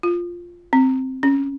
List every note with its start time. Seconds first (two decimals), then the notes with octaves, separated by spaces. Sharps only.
0.03 F4
0.73 C4
1.23 C#4